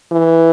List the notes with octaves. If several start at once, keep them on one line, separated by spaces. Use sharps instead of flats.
E3